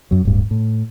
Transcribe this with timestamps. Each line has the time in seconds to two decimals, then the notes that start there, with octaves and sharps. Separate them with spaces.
0.11 F#2 F#3
0.25 D1 G2
0.51 A2